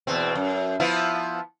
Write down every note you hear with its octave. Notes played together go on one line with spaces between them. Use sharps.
E2 B2 C4
F#2
F3 B3 E4